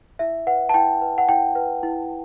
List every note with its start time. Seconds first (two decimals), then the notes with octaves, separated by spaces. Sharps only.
0.19 E4 E5
0.47 B4 F#5
0.69 A5
0.74 E4 G5
1.02 B4
1.18 F#5
1.29 E4 G5
1.55 B4
1.83 E4